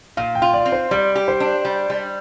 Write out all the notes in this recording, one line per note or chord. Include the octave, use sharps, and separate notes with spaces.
A#2 F5
G5
F4
D5
C4
C5
G3 D5
G4
C5
D4
G3
G3